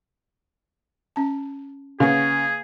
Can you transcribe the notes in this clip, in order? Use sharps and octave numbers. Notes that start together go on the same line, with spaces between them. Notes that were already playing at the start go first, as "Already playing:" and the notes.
C#4 A5
C#3 A#3 G#4 B4 C#6